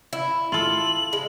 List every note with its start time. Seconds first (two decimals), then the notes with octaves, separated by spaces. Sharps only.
0.13 E4
0.52 F4 A4 F#7
1.13 G#3